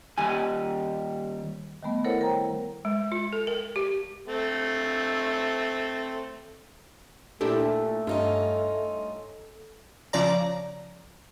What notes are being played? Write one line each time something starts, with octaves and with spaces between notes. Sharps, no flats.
D#2 G3 G#5
D#3 G3 A3 B3
E4 A4 A#4 C5 C#5 F#5
A#4 G5 A#5
G#3
F4
A4
A#4
G4
A3 C4
A#2 A3 D4 E4 G4 A4
G2 C#4 D#4 F4
C#3 F3 D5 A#5